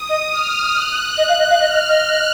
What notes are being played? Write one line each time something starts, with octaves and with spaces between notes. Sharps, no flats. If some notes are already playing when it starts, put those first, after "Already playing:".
Already playing: D#6
D#5
F6
F#6
D#5
F5
D#5
F5
D#5 F6
D#5
D#5
F#6